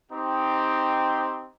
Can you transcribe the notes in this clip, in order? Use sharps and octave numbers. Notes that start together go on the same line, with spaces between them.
C4 D#4 G4